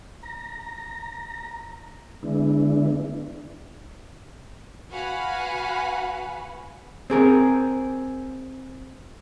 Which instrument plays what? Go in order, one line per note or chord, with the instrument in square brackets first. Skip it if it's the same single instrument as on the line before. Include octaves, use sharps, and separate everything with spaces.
[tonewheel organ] A#5
D3 G#3 B3 D4 E4
[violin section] F#4 B4 F5 F#5 G#5 B5
[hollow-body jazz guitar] C4 G#4 A#4